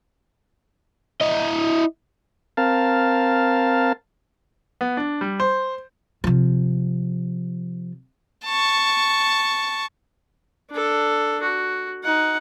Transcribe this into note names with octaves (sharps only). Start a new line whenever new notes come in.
E4 D#5
C4 A#4 F5 A5
B3
D4
G3
C5
C3 F3
A5 C#6
D4 A4
F#4
D#4 F#5